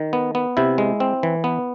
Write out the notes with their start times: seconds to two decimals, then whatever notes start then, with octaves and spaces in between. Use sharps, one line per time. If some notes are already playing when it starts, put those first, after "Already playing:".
Already playing: D#3
0.13 B3
0.35 B3
0.57 C3 E4
0.78 G#3
1.00 C4
1.23 E3
1.44 B3